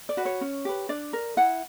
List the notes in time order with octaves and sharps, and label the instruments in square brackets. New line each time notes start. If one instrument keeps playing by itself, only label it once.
[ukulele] D5
F#4 B4
C#5
C#4
G4 B4
D4 D5
A#4
E4 F#5